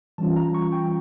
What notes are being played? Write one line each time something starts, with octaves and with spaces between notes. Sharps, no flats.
E3 G3 C#4 F4 A5
A#5
C#6
G5